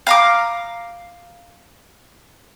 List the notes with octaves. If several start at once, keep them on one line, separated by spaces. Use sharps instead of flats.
F5 A#5 D6